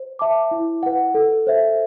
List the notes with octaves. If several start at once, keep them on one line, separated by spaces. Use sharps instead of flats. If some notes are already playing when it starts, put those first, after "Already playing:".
Already playing: C5
E5 A5 D6
E4
B4 F#5
A4
C5 E5